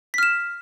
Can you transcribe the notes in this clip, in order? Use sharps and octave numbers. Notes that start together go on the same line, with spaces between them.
F6 B6 E7